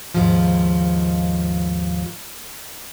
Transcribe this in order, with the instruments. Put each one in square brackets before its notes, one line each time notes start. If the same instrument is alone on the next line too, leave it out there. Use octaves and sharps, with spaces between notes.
[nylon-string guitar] D#2 G#2 F3